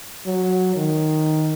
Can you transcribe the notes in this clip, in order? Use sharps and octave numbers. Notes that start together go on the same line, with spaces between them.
F#3
D#3